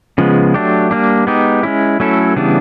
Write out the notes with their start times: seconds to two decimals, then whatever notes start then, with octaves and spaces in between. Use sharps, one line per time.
0.18 C#3 F3 G#3 B3
0.54 F#3 A3 D4 G4
0.91 G3 A#3 D4
1.27 G#3 B3 D#4 G4
1.63 G#3 C#4 E4
2.00 F#3 A3 C#4 E4 A4
2.36 C#3 E3 G3 B3 D4